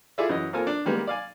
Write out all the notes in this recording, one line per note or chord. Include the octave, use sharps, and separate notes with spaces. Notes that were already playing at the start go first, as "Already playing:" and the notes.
E4 F4 G#4 A4 D5 E5
F#2 E3 D#5
A#3 C4 F4 A4 A#4 G#5
D4
D#3 G3 G#3 A#3 B3
D5 F5 G#5